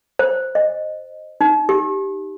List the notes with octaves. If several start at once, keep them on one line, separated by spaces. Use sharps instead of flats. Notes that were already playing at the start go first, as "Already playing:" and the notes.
C5
D#5
D#4
G4